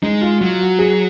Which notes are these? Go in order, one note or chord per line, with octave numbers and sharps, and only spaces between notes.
G#3 D#4
F4
F#3 F4
F#4
G#4